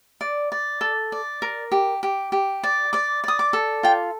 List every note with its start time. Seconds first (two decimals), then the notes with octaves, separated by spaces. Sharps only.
0.21 D5
0.52 D5
0.81 A4
1.12 D5
1.42 A#4
1.72 G4
2.03 G4
2.32 G4
2.63 D5
2.93 D5 D6
3.24 D5 D#6
3.39 D6
3.53 A4
3.83 F4 G5